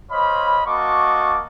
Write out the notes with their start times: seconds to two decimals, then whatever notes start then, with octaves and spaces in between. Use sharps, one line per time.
0.11 C5 C#5 D#5 F5 B5
0.67 A#3 F#4 D#5 A5 C#6 D6